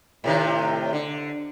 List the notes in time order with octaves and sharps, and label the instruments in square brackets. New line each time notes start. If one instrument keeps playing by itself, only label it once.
[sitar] A2 C3 D#3
D3